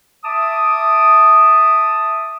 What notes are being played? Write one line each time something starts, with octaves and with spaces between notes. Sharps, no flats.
E5 A5 D6 D#6